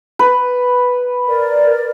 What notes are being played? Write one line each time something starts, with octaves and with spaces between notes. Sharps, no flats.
B4
A#4 D5